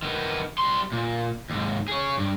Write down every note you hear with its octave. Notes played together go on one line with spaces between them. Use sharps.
D#3 B3
G3 C6
A#2
D#2 G#2
G#4 C#5
G2